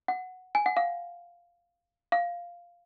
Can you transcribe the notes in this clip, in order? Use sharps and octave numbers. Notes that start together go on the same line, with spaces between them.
F#5
G#5
F#5
F5
F5